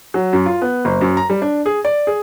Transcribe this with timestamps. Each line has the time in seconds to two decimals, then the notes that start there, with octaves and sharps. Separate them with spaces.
0.14 F#3
0.33 F#2
0.46 F4
0.62 B3
0.85 F#1
1.01 F#2
1.17 A#5
1.30 G3
1.42 D4
1.66 G#4
1.85 D5
2.07 G#4